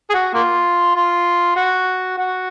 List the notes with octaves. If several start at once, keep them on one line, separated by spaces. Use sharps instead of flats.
G#4
F#4
A#3 F4
F4
F#4
F#4